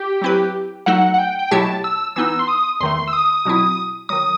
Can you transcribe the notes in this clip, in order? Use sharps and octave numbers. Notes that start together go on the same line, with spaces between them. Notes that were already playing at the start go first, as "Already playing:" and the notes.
Already playing: G4
F#3 C4 E4 B4
F#3 A3 D#4 A4 F#5
F#5
G5
G5
B2 F#3 A3 E4 G4 A5
E6
E3 B3 D#4 E6
C6
D#6
E2 D#3 A3 C6
E6
D#6
B2 F#3 C4 E4
D#3 F#3 D#6